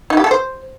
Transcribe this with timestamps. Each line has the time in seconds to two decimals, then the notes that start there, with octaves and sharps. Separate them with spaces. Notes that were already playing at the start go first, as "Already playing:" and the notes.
0.10 D#4
0.17 G4
0.24 A4
0.31 C5